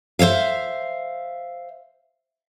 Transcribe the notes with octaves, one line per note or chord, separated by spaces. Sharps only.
C5 C#5 E5 F5